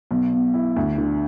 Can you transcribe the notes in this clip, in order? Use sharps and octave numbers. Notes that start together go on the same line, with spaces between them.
B1
B2
E4
D2
D3